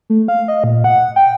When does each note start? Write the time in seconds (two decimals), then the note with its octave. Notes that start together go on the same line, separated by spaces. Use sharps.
0.10 A3
0.28 F5
0.48 D#5
0.64 A#2
0.84 F#5
1.16 G5